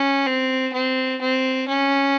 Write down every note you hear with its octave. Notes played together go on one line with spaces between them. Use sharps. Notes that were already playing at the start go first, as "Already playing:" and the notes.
Already playing: C#4
C4
C4
C4
C#4